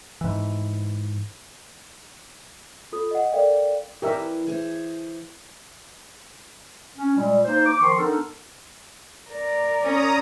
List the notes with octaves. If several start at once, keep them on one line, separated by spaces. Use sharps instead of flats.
G#2 E3
F4 A4 D#6
D#5 F#5
A4 A#4 D5 F5 G5
E3 G4 A#4 E5
E3 G#4 C5
C#4
A#2 G3 G#3
A#3 D#4 C5
D6
D#3 F3 C6 C#6
B3 D4 D#4 A4 A#4
A#4 D5
C#4 A#5 D#6